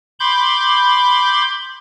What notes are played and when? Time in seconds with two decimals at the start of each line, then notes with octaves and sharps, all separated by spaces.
0.20 B5 C6 D6 G6